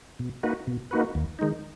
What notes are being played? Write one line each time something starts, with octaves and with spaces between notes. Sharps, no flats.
B2
A#3 D#4 F#4 B4
B2
A#3 D#4 F#4 B4
D#2
D#3 G#3 D#4